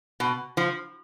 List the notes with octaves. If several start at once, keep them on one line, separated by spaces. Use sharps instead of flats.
B2
F3